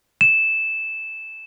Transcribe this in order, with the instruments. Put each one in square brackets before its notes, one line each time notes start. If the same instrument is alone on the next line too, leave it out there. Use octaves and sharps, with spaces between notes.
[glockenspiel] E7